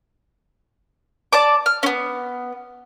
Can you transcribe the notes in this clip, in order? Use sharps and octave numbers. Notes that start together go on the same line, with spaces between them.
D5 A5 D6
F6
B3 C#4